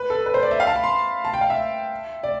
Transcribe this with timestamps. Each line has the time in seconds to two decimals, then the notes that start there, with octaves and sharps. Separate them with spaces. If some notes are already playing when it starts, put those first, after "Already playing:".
Already playing: B4
0.10 A4
0.26 B4
0.34 C5
0.43 D5
0.51 E5
0.60 F5
0.67 A5
0.76 B5
0.84 C6
1.25 A5
1.34 G5
1.41 F5
1.50 E5
2.23 D5